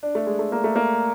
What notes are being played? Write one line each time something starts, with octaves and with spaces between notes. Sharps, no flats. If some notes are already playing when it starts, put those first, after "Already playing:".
D4
A3
G#3
A3
A#3
A3
A#3